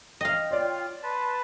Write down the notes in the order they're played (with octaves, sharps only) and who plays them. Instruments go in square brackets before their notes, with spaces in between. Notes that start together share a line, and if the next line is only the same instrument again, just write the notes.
[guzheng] D#5 F5 [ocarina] G5
[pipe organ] F4 [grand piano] C#5 D5
[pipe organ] B4 A5 [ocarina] C6